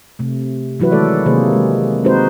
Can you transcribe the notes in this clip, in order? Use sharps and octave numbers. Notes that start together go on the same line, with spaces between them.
C3 A3
E3 F#3 E4 F#4 B4
D#3 G#3 A3 A4 D5
C3 D#3 A#3 G#4 C5
G#3
G#3 C4 D#4 F#4 B4 C5